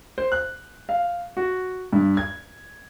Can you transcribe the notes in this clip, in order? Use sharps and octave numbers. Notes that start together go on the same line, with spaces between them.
C5
F#6
F5
F#4
G2
G#6